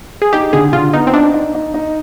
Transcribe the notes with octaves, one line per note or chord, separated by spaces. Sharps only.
G#4
D#4 G4
D3 G#4
D3 F4
B3 D#4
C4
D4 D#4
D#4
D#4
D#4